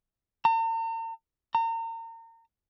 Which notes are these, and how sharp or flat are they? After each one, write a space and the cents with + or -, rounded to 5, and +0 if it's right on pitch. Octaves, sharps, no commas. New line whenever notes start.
A#5 -45
A#5 -35